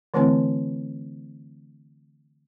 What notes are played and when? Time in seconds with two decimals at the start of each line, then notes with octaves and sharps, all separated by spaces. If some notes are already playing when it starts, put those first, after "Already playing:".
0.14 D3 E3 A3 C4 E4 G#5